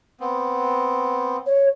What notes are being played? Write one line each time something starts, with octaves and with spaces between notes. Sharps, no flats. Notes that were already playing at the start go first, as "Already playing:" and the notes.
B3 C4
C#5